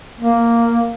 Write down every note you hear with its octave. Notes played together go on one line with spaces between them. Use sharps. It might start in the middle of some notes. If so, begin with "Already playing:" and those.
A#3